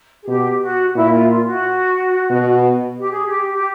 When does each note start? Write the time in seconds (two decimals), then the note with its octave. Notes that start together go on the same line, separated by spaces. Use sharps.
0.24 G#4
0.28 B2 G4
0.62 F#4
0.95 A#2 E4
1.12 F4
1.29 F4
1.45 F#4
2.30 B2
2.97 G4
3.11 G#4
3.24 G4
3.54 G4